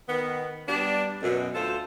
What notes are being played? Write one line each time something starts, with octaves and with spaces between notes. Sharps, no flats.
D#3 B3
G3 B3 D4
F#2 B2
D2 F4 A4 C5